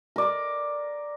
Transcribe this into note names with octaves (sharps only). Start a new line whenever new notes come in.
A#4 D5